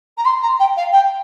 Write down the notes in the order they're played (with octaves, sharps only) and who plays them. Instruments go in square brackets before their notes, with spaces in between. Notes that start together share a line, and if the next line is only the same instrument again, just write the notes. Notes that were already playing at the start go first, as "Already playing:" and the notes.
[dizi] A#5
C6
A#5
G5
F5
G5